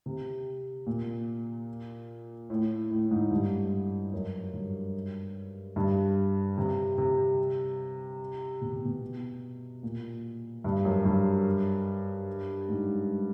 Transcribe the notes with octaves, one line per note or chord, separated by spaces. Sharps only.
C3
A#2
A2
A2
G#2
G2
F#2
G2
G2
C3
C3
B2
C3
B2
A#2
G2
F#2
G2
G#2